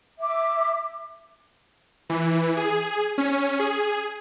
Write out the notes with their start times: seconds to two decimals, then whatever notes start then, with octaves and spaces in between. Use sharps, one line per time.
0.20 E5 D6
2.10 E3
2.57 G#4
3.18 C#4
3.59 G#4